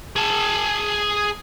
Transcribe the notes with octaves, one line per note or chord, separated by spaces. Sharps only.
G#4 A5